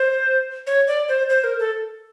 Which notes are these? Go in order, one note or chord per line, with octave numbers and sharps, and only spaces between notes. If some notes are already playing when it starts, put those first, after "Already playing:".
Already playing: C5
C#5
D5
C5
C5
A#4
A4